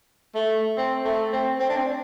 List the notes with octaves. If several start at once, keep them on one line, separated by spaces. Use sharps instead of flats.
A3
C4
A3
C4
C4
D4
C4